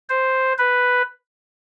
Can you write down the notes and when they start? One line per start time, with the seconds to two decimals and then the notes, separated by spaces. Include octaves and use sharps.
0.09 C5
0.58 B4